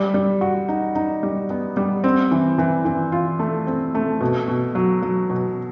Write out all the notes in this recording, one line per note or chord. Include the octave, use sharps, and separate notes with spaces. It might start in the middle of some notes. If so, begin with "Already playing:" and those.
Already playing: G3
G3
F#4
D#4
D#4
G3
B3
G3
C4
E3
E3
E3
F4
A3
C4
A3
B2
B2
F#3
F#3
B2